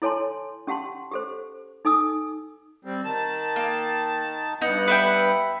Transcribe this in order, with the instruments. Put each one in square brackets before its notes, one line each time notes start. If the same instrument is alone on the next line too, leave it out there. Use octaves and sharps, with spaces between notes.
[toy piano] E4 A4 C#5 G#5 A5 C6
C#4 G4 F#5 A5 C6
G4 A4 C5
D#4 A4 G#5 D#6 E6
[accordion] G3 C4
D#3 A5
[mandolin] A#3
[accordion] G2 B3 F#5 [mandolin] D#4
[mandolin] B4 E5 G5